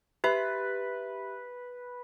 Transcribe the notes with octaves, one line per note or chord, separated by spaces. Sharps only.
G4 B4 E5